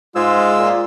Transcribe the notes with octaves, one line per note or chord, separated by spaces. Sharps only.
G#2 G#3 F4 E6
A#2